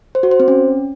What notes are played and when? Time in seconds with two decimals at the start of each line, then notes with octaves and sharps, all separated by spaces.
0.15 C5
0.23 F#4
0.31 C5
0.40 C4
0.48 C#4